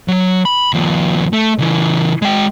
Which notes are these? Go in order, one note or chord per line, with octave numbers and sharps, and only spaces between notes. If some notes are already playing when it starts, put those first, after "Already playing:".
F#3
B5
D#2 F3
A3
C#3 E3
G#3 G5